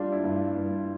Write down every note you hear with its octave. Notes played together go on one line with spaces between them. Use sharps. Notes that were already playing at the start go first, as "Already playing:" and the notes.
Already playing: G3 D4 F4
E4
G2
G2